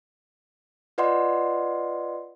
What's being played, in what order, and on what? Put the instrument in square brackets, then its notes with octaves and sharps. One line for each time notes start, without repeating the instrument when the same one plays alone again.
[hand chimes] F4 B4 D5 D#5 F#5 C6